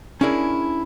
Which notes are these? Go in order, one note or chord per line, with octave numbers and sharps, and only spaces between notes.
C#4 D4 E4 G#4 A#4